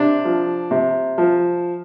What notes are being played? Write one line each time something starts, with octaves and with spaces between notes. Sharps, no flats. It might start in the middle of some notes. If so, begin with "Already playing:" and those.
Already playing: C3 D4
F3
C3
F3